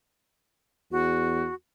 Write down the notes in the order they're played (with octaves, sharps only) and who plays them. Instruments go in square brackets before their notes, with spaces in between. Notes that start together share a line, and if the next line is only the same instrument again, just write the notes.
[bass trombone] E2 [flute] F#4